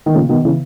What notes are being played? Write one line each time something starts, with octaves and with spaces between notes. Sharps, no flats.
D#3
A#2 C#3
B2 D#3
C#3 E3